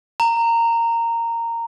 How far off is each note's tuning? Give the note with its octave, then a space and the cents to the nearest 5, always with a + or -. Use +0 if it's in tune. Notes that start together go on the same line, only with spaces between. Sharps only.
A#5 -15